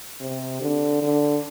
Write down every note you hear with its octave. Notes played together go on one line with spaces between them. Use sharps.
C3
D3
D3